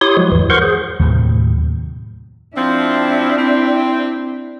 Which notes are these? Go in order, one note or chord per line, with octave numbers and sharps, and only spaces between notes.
E4 G4 C#5 C6 D#6
F3 F#3 G#3 F#4
E2 G#2 E3
A#4 C5 F#5 C6 C#6
G#4 C5
D#2 A2 C3 F#3
F3 C4 D4 E4
C4